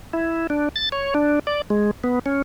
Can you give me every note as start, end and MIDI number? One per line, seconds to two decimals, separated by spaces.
0.13 0.47 64
0.50 0.69 62
0.76 0.89 93
0.92 1.14 73
1.15 1.39 62
1.47 1.62 74
1.70 1.91 56
2.04 2.19 59
2.26 2.42 61